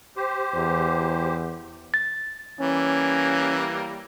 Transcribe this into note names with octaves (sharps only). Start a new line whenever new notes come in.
G4 C5
E2
A6
E3 G3 A#3 C#4